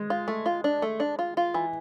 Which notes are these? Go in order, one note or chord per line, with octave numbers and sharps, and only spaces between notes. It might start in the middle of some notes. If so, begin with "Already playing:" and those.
Already playing: G#3
F4
A3
F4
D4
A3
D4
F4
F4
E3